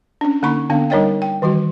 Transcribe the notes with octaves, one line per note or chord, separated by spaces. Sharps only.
C#4 D4
D3 A#3 D#4 B5 C#6
D3 B3 D4 F5
G3 D#4 A#4 C#5 D#5 G5
G5
D#3 E3 G3 F#4